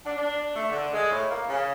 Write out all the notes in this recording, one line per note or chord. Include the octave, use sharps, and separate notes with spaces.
D4
D4
A3
D3
G#3
A2
A#3
C#3